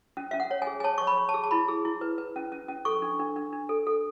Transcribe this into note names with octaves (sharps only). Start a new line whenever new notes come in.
C#4
C#4 E5
F#5
C#5
G#5
G#4
G#5
C#5 A5
C#6
C#5
B5
C#5
A5
G#4
A5
E4 B5
G#4
E4
B4
B4
C#4
C#4
C#4
A4 C#6
D4
D4
D4
D4
A4
A4